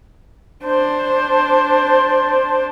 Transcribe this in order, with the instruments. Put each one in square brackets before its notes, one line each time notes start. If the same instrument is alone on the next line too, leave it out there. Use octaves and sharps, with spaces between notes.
[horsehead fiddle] D4 C5